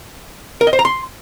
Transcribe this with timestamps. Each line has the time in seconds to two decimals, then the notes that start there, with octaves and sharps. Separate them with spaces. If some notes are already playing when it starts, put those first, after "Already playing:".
0.61 A#4
0.67 D#5
0.73 C5
0.79 A#5
0.85 C6